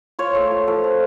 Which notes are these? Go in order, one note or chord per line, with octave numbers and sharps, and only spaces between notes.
F4 C#5
A3
F4
F3 A4
A3